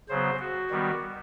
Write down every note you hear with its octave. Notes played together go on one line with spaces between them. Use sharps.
C#3 F#3 B3 C5
F#4
D#3 G3 B3